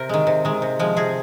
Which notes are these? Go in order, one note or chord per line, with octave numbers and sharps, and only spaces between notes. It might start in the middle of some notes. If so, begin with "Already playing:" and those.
Already playing: C3 A#4
D#3 G#3
C3
D#3 G#3
C3
F3 G#3
C3 G#4